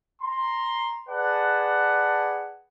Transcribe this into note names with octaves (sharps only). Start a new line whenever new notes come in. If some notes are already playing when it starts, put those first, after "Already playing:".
A#5 C6
G#4 B4 D5 F#5 A5